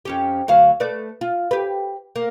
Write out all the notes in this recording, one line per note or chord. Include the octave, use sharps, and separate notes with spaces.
F2 C#4 G4
D2 F#3 F5
A3 B4 D5
F4
G4 B4
A#3